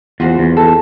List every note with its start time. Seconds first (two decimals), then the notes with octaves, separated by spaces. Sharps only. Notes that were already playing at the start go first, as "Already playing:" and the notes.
0.20 E2 F4 F#4 C5
0.39 E2
0.57 A4